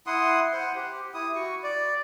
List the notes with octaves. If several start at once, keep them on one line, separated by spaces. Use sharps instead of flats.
E4 F#5 C6 D#6
C5 F#5
G4
E4 D#6
F#4 C#6
D5